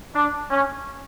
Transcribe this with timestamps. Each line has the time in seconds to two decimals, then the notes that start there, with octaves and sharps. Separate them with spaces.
0.14 D4
0.50 C#4